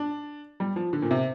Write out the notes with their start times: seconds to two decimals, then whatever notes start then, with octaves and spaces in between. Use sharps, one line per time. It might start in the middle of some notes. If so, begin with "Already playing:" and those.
Already playing: D4
0.60 G3
0.76 F3
0.93 D3
1.02 A#2
1.11 C3